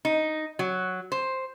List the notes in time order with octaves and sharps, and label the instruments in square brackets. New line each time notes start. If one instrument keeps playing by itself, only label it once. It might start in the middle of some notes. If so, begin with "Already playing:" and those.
[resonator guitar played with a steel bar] D#4
F#3
C5